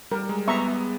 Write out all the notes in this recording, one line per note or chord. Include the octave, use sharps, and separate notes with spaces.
G3 A#4
G#3
B3 E5 A#5 C#6